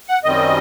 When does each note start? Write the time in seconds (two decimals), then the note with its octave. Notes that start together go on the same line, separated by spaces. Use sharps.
0.09 F#5
0.24 F#2 D#3 G3 C4 D#5